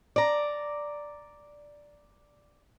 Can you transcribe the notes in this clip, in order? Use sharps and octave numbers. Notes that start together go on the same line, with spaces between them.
D5 A#5